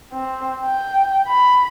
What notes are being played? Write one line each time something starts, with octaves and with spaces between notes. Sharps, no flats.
C4
G5
B5